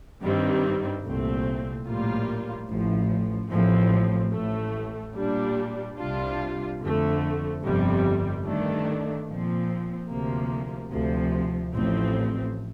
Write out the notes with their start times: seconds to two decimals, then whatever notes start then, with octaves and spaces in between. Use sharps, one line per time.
0.21 G2 D#3 G3 C4
1.04 C2 A#2 A3 C4
1.85 A#1 A2 G3 A#3 F4
2.68 A1 A2 F3
3.51 A1 A2 F3 C4
4.33 A1 A2 A3
5.16 A#2 G3 D4
5.98 C2 C3 G3 D4 F4
6.81 F2 D3 A3
7.62 G1 F2 C3 G3
8.45 G2 D#3 A3 D4
9.27 A#2 F3 C4
10.09 D2 C3 F3 A#3
10.91 D2 C3 F3
11.74 A1 A2 F3 C4